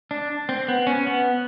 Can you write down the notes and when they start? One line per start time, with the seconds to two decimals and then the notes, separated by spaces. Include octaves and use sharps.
0.11 D4
0.49 C4
0.68 B3
0.87 C#4
1.07 B3